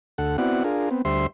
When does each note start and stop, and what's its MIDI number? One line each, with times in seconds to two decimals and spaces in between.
0.18 0.37 38
0.18 0.37 69
0.18 0.37 78
0.38 0.63 59
0.38 0.63 60
0.38 0.63 64
0.38 0.63 66
0.38 0.63 74
0.38 0.63 78
0.64 0.89 62
0.64 0.89 65
0.64 0.89 68
0.64 0.89 70
0.91 1.02 59
0.91 1.02 60
1.05 1.27 38
1.05 1.27 55
1.05 1.27 72
1.05 1.27 76
1.05 1.27 84